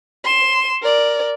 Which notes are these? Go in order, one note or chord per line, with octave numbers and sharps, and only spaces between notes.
C6 E7
A#4 D5